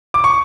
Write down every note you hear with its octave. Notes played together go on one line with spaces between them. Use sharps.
D6
C#6